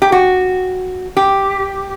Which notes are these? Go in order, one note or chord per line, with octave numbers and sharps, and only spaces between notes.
G4
F#4
G4